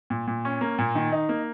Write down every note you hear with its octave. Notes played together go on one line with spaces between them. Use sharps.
A#2
A#2
C#4
A#3
A#2
D#3
D#4
A#3